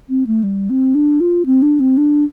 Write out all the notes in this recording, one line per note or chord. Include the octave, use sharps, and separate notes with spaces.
C4
A3
G3
C4
D4
F4
C4
D4
C4
D4